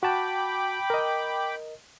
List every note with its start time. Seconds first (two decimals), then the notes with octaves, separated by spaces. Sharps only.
0.03 F#4 G5 A5 B5 D6
0.90 A#4 D#5